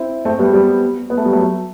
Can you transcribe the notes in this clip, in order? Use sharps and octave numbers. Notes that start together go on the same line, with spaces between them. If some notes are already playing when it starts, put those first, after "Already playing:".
Already playing: C4 E4
A3 C4
G3 B3
G3 B3
B3
A3
G3
F#3 A3